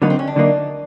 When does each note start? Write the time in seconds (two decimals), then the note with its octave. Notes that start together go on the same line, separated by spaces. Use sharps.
0.02 D3 F#3 A#3 B3 D#4
0.10 C4
0.19 C#4
0.27 D4
0.36 D3 F#3 A#3 D#4